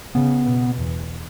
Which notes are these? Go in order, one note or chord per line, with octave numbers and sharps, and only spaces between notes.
C#3 B3
B2
E2